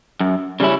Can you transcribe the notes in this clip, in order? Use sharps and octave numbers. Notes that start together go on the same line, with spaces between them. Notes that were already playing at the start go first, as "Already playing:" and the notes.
F#2
C#3 G3 C#4 E4